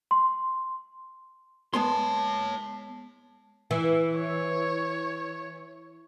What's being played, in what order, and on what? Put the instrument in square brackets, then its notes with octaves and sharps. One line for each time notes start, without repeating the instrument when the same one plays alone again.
[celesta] C6
[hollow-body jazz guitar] G#3 B3 C6 [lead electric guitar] C#5 A5
[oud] E3
[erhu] C#5